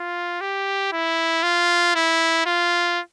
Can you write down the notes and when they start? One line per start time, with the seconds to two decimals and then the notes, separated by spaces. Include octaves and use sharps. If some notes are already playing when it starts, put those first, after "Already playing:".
Already playing: F4
0.41 G4
0.93 E4
1.43 F4
1.96 E4
2.46 F4